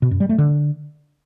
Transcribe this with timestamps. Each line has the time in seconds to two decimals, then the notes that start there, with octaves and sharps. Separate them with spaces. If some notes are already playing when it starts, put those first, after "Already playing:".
0.02 B2
0.11 F#2
0.20 G3
0.29 A3
0.38 D3